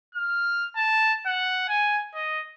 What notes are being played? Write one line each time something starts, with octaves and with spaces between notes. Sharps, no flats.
F6
A5
F#5
G#5
D#5